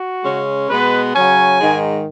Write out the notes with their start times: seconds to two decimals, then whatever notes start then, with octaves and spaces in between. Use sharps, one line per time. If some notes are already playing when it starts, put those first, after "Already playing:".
Already playing: F#4
0.24 C#3 G#3 C#4
0.69 B2 G#3 B3 B4
1.14 C#3 F#3 C#4 G#5
1.60 G#2 D#3 G#3